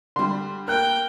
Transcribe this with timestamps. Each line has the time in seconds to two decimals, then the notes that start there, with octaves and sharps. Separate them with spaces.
0.16 D3 G3 C6
0.68 A#3 G5 F6 F#6